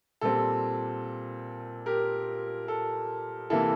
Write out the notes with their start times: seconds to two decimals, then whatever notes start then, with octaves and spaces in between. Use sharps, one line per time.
0.21 A#2 G3 C4 A4
1.86 G4 A#4
2.68 A4
3.50 C3 E3 A#3 E4 A4